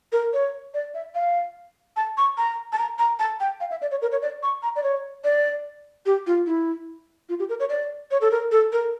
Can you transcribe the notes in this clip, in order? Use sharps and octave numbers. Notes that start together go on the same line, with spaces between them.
A#4
C#5
D5
E5
F5
A5
C#6
A#5
A5
A#5
A#5
A5
G5
F5
E5
D5
C#5
A#4
C#5
D5
C#6
A#5
D5
C#5
D5
G4
F4
E4
F4
G4
A#4
C#5
D5
C#5
A4
A#4
A4
A#4